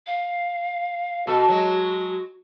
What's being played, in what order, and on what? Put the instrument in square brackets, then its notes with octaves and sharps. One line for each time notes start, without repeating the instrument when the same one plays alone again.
[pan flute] F5
[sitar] B2 A4 [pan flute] F#4
[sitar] F#3 G#3